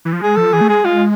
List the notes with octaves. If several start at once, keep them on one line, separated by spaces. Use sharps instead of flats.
E3
F3
G#3 G#4
F3 A4
E3 G#4
A3
G#3 G#4
G#3 F4